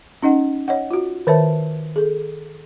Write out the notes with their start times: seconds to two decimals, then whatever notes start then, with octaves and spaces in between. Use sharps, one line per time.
0.23 C#4 D#4 D#5 F#5
0.68 C#5 D#5 F#5
0.91 F4 F#4
1.27 D#3 A#4 C5 C#5 E5 A5
1.96 G#4 A4